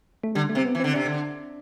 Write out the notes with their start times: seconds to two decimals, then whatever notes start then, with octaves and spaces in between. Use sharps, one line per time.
0.23 A3
0.35 D3 G3
0.49 A3
0.55 C3 C4
0.65 B3
0.75 E3
0.80 D3 C4
0.94 C3 D4
1.05 D3